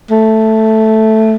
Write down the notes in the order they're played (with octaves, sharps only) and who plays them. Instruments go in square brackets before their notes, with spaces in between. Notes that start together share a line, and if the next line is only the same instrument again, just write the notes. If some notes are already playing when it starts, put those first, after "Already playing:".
[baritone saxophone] A3